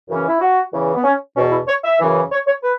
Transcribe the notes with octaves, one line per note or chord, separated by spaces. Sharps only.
F#2 C#3 E3
C#4
E4
F#4
E2 C#3 E3
B3
C#4
E2 B2 C#4
E4
C#5
E5
F#2 C#3 E3
C#5
C#5
B4